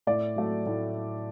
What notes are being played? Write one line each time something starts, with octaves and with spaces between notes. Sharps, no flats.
A2 D5
F#3 A3
A2